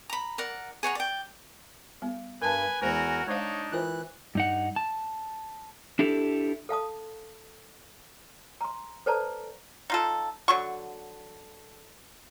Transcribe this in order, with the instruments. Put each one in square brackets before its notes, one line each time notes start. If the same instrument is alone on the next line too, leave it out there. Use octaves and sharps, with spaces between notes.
[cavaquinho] A#5 B5
A#4 D5 F#5
G#4 C#5 F#5 A#5
D5 G5
[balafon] G3 B3
[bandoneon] G2 [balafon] A#4 A5 [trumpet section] B4 G#5
[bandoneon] E2 G#5 [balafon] G#3 C5 [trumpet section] F#4 A#4
[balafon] G#3 C5 F5 [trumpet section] D4 D#4 [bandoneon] C#5
[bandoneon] E3 F#6 [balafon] F4 A#4 C5
[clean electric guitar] G2 D#4 F#5
A5
D4 E4 G4 A4
[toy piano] A4 F5 A5 D#6
A#5 C6
A4 B4 C5 D5 A5 A#5
[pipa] D#4 F4 A4
D3 F#3 C#6